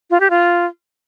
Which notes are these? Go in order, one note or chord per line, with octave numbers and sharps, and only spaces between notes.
F4
G4
F4